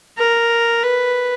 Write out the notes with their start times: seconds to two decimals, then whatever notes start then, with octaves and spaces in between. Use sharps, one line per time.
0.18 A#4
0.83 B4